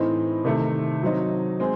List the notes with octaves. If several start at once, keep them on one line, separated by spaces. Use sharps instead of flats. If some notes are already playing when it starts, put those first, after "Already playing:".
Already playing: A2 E3 C4 D#4
C3 D#3 A3
F#3 C4 D#4
G#3 C4